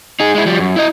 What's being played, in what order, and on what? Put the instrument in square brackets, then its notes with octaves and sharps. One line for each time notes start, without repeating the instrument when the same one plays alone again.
[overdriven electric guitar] D#4 G#4
G#3 E4
F3 G3
F#2
E4 D#5